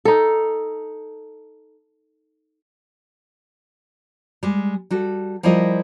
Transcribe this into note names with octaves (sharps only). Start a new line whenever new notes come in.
D#4 A4
G3 G#3
G3 F#4 A4
F3 G3 E4 F4 A#4 D#5